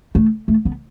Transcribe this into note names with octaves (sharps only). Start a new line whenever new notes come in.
A3
A3
B3